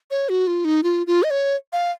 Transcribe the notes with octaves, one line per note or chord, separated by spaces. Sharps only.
C#5
F#4
F4
D#4
F4
F4
D#5
C#5
F5